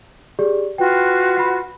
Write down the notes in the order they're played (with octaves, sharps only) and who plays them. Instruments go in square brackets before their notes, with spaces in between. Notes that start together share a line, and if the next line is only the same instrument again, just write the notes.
[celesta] G4 G#4 D5
[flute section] F4 F#4 B4 [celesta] G5
[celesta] F#5 B5